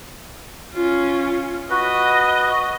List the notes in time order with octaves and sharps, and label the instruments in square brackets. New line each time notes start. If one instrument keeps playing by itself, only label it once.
[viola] C#4 F4
[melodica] F#4 B4 [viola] D#5